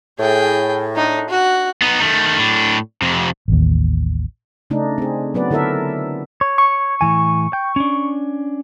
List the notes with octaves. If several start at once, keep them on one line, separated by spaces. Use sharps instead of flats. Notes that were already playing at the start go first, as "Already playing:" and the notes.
A2 G#4 G5
D4 D#4
F#4
B3 D#4
D#3 A3
A2 D4
F2 C3
A1 D#2
C#3 A3 D4 D#4
C4 G#4
F#3 B3 B4 D5
D3 E4 A4 A#4 E5
C#5
C#6
A2 E3 G#5
G5
C#4 D4